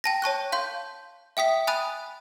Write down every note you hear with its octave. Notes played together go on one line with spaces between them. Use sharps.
G5 A5 A#6
C#5 A5 C#6 F#6
F5 C6 G6
E5 G5 D#6 B6
G#5 B5 D#6 F#6 A6 D#7